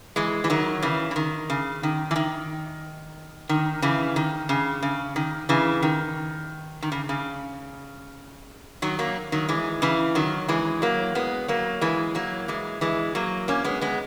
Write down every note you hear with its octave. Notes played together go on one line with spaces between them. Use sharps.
E3 G#3
E3
D#3 F#3
C#3 E3
E3
D#3
C#3
D#3
E3
D#3
D#3
C#3 E3
D#3
C#3
C#3
D#3
C#3 E3
D#3
D#3
C#3
C#3
D#3 F#3
F#3 A#3
D#3 F#3
E3 G#3
C#3 E3
D#3 F#3
E3 G#3
F#3 A#3
G#3 B3
F#3 A#3
E3 G#3
F#3 A#3
E3 G#3
E3 G#3
F#3 A#3
A#3 C#4
G#3 B3
G#3 B3